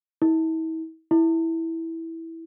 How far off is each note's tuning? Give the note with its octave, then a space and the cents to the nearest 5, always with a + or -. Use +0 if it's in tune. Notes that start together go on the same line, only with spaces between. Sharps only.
E4 -40
E4 -10